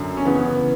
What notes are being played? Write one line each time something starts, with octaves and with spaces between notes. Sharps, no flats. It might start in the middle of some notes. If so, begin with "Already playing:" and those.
Already playing: F#2 D3
C#4
E2 C#3 E3 B3